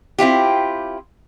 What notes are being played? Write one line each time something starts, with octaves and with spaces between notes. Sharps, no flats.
C4 E4 F4 G4